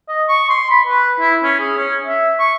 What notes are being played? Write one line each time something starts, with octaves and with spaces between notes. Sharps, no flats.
D#5
C#6
C6
B5
B4
E4
C#4
G#4
C#4
E5
C#6